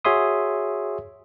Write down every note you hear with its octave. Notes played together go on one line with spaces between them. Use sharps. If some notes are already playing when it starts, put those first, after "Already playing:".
F#4 G#4 C#5 E5 C6 D#6